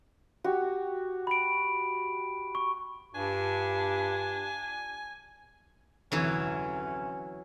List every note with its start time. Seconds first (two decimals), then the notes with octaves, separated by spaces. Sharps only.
0.44 F#4 G4
1.27 B5 D7
2.55 C#6
3.15 G2 D4 F4 G4 G#5
6.12 F1 D2 E3 F#3 C#4 C#6